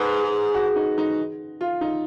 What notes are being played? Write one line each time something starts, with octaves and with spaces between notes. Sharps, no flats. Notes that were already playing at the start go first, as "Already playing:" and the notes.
Already playing: G#2 B4
G#4
F#4
D#4
D#4
F4
D#4